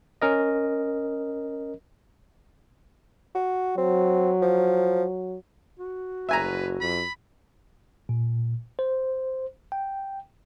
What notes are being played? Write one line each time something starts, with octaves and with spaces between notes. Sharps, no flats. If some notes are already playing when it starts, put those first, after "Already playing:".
C#4 A#4 D#5
F#4
F#3 C4
F3
F#4
F#1 B4 E5 G#5 A#5
F2 B5
A#2
C5
G5